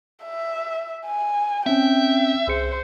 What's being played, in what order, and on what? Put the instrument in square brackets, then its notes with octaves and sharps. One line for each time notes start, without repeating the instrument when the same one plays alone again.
[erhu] E5
G#5
[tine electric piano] C4 C#4 [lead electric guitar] E5 [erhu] G5
[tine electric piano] C2 G#4 C#7 [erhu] C5